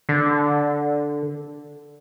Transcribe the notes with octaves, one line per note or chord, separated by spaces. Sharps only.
D3